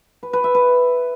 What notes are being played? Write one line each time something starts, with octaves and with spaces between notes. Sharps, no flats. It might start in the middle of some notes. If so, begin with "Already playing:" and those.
B4
B4
E5
B4